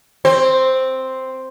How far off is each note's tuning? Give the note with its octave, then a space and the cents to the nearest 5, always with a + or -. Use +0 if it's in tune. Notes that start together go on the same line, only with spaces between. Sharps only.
C4 +0 C5 +0